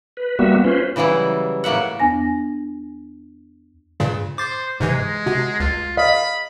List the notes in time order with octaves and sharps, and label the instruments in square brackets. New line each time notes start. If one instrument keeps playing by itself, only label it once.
[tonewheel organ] B4
G3 A#3 B3 F#4 E5
C#4 F4 B4 C5
[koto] C#3 E3 F#3 G3 E4
A2 A#3 E5 F#5
[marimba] E2 B3 D4 G#5 A#6
[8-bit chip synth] G2 A#2 C#3
[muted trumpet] C5 [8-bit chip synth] D6 A6
[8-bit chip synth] G#2 C3 E3 [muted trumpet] G#3
[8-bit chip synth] C3 [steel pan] F#4
[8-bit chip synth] C#2 [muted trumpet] F4
[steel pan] D#5 F5 [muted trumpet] B5